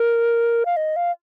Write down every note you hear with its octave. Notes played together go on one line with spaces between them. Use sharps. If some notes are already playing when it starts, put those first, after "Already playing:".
Already playing: A#4
F5
D#5
F5